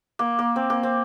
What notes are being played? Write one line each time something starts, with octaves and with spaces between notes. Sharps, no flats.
A#3
A#3
C4
A#3
C4